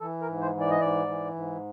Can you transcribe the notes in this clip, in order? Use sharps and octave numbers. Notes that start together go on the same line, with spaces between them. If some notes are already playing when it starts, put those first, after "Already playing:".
E3 A4
A#4
G#2
C5
E3
D5
D#5
G#2 D5
E3
G#2